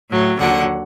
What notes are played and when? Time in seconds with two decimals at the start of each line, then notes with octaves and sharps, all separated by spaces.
0.11 A2 F#3
0.39 D#2 D3 F#3 F#5